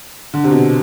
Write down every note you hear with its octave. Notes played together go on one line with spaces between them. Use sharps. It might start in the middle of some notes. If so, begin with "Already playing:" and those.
D3
C3
B2